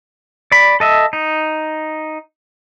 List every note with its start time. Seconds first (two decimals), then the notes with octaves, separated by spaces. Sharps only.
0.52 D5 B5
0.80 A4 D#5 E5
1.13 D#4